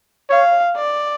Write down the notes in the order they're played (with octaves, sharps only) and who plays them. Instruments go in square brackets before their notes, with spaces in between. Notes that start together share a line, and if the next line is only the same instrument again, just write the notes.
[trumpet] C#5 [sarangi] F5
[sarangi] D5